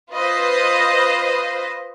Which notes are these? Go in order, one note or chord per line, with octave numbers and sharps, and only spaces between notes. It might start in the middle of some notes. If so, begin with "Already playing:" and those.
F4 B4 C5 D#5